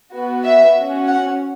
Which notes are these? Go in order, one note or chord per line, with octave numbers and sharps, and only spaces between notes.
B3 F#4
E5
C#4 F#4
F#5